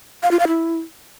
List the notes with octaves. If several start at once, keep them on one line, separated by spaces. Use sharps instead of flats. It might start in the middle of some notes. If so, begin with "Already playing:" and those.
F5
F4
F5
E4